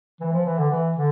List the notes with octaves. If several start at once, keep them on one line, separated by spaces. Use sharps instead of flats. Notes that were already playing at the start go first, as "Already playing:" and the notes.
E3
F3
E3
D3
E3
D3